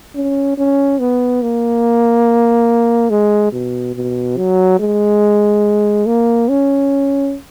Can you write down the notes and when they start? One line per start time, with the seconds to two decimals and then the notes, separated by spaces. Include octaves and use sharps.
0.15 C#4
0.58 C#4
0.99 B3
1.42 A#3
3.10 G#3
3.53 B2
3.95 B2
4.37 F#3
4.80 G#3
6.06 A#3
6.49 C#4